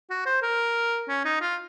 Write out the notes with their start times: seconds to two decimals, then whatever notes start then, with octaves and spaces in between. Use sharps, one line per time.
0.10 F#4
0.26 C5
0.43 A#4
1.09 C#4
1.25 D#4
1.41 F4